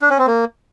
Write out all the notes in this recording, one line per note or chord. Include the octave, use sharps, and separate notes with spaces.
D4
C#4
C4
A#3